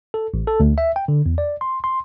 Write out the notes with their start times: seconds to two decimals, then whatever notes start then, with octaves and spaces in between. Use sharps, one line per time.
0.14 A4
0.34 A1
0.47 A4
0.60 D2
0.78 E5
0.96 G5
1.08 D3
1.26 E2
1.38 D5
1.61 C6
1.84 C6